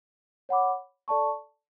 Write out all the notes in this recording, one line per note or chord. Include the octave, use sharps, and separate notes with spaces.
C#5 F#5 B5 D6
A4 D5 A5 C#6